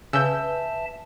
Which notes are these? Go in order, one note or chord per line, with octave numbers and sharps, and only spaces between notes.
C#3 B4 E5 G#5 A5 E6 G6